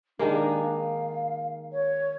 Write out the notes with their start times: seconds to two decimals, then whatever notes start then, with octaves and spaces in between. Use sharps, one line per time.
0.19 D#3 G#3 A#3 D4
0.61 F5
1.73 C#5